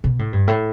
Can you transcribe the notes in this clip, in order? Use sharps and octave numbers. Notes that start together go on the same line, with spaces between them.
B2
A2
G2
A2